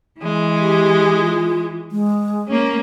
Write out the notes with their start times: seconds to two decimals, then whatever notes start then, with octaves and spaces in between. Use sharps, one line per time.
0.19 E3 G#3
0.60 G4
1.20 F4
1.92 G#3
2.48 A#3 C#4